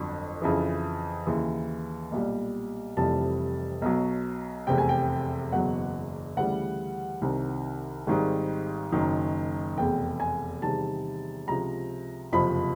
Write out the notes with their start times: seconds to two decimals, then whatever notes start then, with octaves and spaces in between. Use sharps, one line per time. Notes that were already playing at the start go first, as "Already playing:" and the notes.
Already playing: G1 F2 D3 F#3
0.42 F2 C#3 E3
1.27 D#2 C#3 E3
2.12 B1 A#2 G3
2.96 F1 F2 C3 E3 G3 A5
3.82 B1 B2 F#3
4.67 F1 E2 C3 G5
4.78 G#5
4.89 G5
5.52 F#1 E2 B2 F#3 F#5
6.37 D2 C#3 E3 G3 F#5
7.21 C2 C3 D#3
8.07 G#1 G#2 D#3 G3
8.92 F#1 F#2 D#3 F#3
9.77 F1 E2 B2 G5
10.20 G#5
10.62 E2 C3 D#3 G3 A5
11.47 C#2 C3 F3 A#5
12.32 F#1 F2 C3 F3 B5